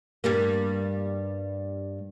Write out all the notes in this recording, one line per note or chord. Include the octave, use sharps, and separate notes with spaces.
G2 G3 A#3